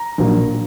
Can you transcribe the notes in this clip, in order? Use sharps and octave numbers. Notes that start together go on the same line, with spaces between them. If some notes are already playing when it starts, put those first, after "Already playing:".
Already playing: A#5
A#1 A#2 F#3 A#3